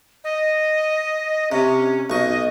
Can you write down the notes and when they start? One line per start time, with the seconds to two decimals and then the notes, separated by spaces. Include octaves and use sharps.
0.24 D#5
1.52 C3 C#4
2.10 B1 D#5 C#6